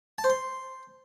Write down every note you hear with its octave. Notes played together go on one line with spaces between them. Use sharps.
A5
C5
C6